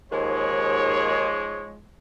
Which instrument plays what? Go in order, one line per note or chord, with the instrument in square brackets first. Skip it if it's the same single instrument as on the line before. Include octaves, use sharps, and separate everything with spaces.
[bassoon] D#2 [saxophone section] G#2 F3 G#3 [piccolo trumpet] C#5